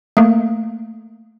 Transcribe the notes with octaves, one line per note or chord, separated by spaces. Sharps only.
A3 A#3